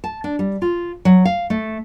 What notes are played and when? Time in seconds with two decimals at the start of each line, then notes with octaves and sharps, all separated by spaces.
0.04 A5
0.24 D4
0.39 G3
0.62 F4
1.05 F#3
1.25 F5
1.50 A3